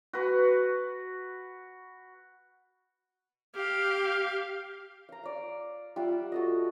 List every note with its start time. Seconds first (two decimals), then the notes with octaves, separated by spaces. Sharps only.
0.13 F#4 B4
3.55 G4 F5
5.09 F5 A#5
5.23 D5 F5
5.96 G3 F4 E5 F#5
6.32 F#4 A4 D#5